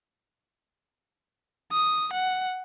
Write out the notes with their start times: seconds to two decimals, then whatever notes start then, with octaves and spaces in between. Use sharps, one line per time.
1.72 D#6
2.13 F#5